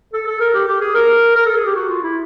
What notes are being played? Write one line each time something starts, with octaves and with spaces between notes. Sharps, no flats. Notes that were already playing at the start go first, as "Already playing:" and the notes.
A4
A4
A#4
G4
G4
G#4
A#4
A#4
A4
G#4
G4
F#4
F4
E4